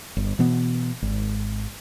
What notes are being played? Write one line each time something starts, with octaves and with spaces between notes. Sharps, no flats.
G1
B2 E3 B3
G#1